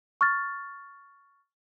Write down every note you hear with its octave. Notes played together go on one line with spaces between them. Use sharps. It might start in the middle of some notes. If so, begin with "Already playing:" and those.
C#6 F6 A6